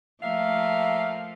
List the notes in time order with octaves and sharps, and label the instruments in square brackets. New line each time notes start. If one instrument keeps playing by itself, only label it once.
[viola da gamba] F3 A3 [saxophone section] A#3 F5 [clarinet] E5